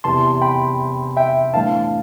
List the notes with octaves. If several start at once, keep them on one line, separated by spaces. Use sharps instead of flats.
E2 C3 E3 A5 C6
G5 B5
E5 G5
A2 E3 B3 D4 F5 A5